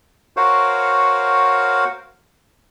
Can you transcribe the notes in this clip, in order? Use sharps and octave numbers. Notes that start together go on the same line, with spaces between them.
F#4 A#4 C5 C#5 F5 F#5